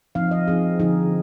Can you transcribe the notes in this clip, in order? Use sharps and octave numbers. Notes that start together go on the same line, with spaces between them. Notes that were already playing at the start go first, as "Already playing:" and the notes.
F3 C4 D#4 F5
D#5
F3 C4 D#4 G#4
D3 F3 C4 D#4 G#4